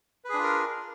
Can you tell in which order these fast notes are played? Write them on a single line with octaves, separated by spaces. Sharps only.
B4 G#4 D4 F4 A#4